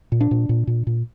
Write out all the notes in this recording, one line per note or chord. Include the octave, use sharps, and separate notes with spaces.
A#2
D4
A#2
A#2
A#2
A#2